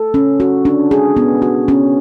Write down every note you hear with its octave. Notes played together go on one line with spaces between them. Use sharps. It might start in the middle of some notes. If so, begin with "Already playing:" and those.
Already playing: A4
C#4
F#4
D4
G#4
B3
F#4
C#4